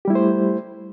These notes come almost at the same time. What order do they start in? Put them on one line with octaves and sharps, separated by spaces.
G4 G3 E4 A3 C5